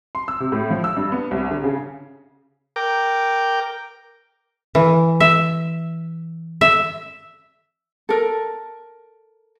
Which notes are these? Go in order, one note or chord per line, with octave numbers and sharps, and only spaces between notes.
C6
E6
C3
A2
F3
E6
G2
B3
C2
D3
C#3
A#4 G5 D6
E3
E5
E5
A4 A#4